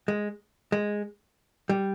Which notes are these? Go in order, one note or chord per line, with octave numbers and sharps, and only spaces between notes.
G#3
G#3
G3